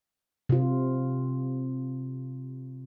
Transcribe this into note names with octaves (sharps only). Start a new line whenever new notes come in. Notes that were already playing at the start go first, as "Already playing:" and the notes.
C3 F4